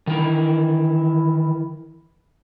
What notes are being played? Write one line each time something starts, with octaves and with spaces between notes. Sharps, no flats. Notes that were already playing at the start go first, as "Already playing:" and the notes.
D#3 E3 A#4